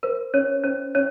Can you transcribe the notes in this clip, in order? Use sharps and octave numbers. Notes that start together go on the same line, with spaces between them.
A#4 C5
C#4 C#5
C#4 C5
C#4 C#5